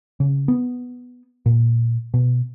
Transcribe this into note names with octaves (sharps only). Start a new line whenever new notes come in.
C#3
B3
A#2
B2